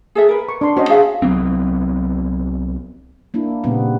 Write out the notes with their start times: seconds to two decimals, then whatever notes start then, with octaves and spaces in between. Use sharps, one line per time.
0.15 G#4 A4 E5
0.29 A#4 B4
0.49 C#6
0.61 D4 C6
0.77 C#4 F#4 C5 D#5
0.90 G#4 E5 F5
1.22 C2 F#3 B3 C4
3.34 A#3 D4 E4
3.64 A#2 C#3 G3 B3 C4